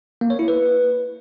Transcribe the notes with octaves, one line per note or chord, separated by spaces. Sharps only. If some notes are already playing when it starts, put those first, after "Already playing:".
A#3
C#5
E4
B4